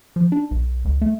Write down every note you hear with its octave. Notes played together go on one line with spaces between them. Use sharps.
F3
D4
B1
C#2
A3